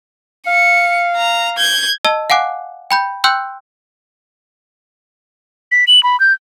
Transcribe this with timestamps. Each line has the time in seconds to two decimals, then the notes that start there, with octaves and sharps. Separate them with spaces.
0.47 F5 C#7
1.16 A#5
1.58 G6 G#6
2.05 D#5 A5 E6 G7
2.30 F5 F#5 G#5 D6 F#6
2.91 G5 B5 G6
3.24 G5 C6 E6 F#6 G6
5.72 B6
5.88 F#7
6.03 B5
6.20 G6